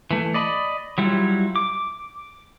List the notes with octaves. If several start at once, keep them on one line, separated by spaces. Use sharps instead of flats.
E3 A3
D5 D#5 B5
F#3 G3 E4 F4
D6